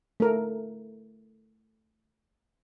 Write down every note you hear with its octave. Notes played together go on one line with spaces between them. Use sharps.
A3 A#4